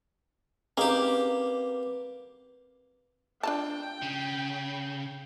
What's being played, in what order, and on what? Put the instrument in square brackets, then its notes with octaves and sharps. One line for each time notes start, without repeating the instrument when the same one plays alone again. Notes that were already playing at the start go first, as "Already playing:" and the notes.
[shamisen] C#3 D#4 [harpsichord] A#3 G4 [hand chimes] C4 B4
[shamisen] D4 F4 A5 [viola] G5
[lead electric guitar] C#3